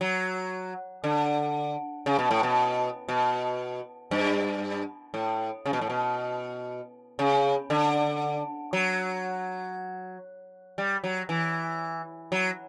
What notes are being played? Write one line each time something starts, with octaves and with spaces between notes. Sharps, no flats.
F#3
D3
C#3
B2
A2
B2
B2
G2
A2
C#3
B2
A2
B2
C#3
D3
F#3
G3
F#3
E3
F#3